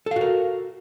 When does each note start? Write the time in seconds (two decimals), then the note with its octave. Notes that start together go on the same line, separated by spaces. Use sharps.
0.06 A4
0.11 F5
0.16 F#4
0.21 A#4